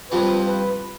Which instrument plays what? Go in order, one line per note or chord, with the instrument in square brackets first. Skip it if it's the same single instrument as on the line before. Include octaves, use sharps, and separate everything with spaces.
[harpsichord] G2 F3 C4 [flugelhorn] B4
[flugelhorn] B4